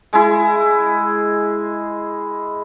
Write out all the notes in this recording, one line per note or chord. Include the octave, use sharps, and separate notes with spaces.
G#3 E4